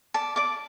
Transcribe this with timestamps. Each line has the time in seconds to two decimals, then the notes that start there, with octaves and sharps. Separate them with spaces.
0.14 D5 A5
0.36 D5 D6